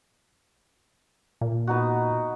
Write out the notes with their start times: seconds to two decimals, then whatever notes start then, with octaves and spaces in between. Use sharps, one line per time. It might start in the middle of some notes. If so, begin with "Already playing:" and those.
1.41 A#2
1.67 B3 D#4 F#4